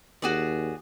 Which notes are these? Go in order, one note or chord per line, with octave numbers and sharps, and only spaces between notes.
D#2 F#4 G#4 D5